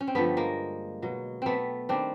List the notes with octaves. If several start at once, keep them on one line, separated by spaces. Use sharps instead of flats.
C#4
C4
G2 D3 F3 A3 B3
G#3 A#3
B2 F#3
A3 B3 C4
D#3 G3 C4 D4